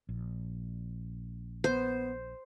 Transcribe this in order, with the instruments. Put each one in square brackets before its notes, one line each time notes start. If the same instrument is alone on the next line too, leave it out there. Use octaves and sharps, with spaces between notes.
[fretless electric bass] A#1
[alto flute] B3 [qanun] C5